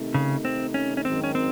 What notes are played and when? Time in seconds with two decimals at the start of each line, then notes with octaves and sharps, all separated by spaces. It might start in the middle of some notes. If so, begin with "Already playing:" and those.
Already playing: C3 D#3 A3 D#4
0.14 C#3
0.45 C4
0.74 C#4
0.97 C#4
1.04 G#1 F#2 D#3 C4
1.24 C#4
1.35 C4